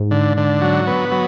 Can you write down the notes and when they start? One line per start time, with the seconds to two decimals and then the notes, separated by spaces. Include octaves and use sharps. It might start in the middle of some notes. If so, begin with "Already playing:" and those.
Already playing: G#2
0.11 D3
0.37 D3
0.61 F#3
0.87 B3
1.12 F#3